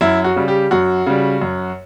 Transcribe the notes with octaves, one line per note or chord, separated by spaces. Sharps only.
F#2 E4
F#4
C#3 G3
G4
F#2 F#4
C#3 G3
F#2